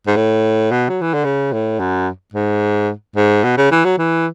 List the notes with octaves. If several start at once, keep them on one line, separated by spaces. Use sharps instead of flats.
G#2
A2
B2
F#3
E3
D3
C#3
A2
F#2
G#2
G#2
B2
C#3
E3
F#3
E3